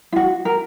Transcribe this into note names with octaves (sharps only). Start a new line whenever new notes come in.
F4
F#4
A#4